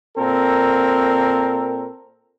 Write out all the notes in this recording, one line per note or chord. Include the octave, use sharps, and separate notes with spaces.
A#2 C4 A4 A#4